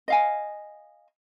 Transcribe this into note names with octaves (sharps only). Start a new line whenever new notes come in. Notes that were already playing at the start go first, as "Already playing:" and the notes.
D#5 F5 G#5